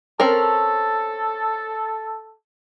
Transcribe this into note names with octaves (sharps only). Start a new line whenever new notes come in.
C4 C#4 A4 A#4